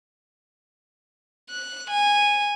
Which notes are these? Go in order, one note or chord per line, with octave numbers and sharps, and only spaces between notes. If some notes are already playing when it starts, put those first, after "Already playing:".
F#6
G#5